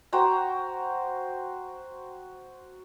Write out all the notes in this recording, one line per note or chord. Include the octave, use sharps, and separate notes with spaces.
F#4 C5 G5 A#5